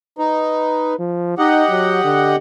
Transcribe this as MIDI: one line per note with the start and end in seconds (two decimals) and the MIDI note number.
0.19 0.94 63
0.19 0.98 71
0.99 1.37 53
1.38 1.64 63
1.38 2.36 67
1.38 2.36 75
1.38 2.36 78
1.70 2.00 54
2.04 2.36 50